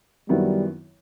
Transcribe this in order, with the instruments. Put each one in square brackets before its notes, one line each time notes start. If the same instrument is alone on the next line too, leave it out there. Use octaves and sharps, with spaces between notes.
[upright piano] F#2 D#3 F#3 B3 E4 [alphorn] G3